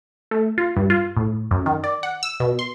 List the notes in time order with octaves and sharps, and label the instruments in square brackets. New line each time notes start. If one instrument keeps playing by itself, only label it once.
[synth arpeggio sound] A3
F4
G2
F4
A2
F#2
D#3
D5
F#5
E6
B2
C6